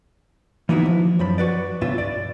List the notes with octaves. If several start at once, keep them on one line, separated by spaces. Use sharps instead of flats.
E3 A#3 B3 D#4 E4 F#4
F3
F#2 F3 B5
F#4 B4 D5
C#2 G2 B2 F4 E5
D5